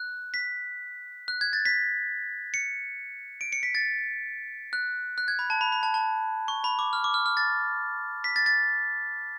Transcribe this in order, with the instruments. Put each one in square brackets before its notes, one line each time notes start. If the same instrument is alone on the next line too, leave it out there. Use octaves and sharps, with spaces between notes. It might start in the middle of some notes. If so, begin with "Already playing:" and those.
Already playing: [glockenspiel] F#6
B6
F#6
G#6
A6
B6
C#7
D7
C#7
B6
A6
F#6
F#6
G#6
B5
A5
B5
B5
A5
A5
C#6
B5
D6
F6
D6
F6
F6
A6
B6
A6
A6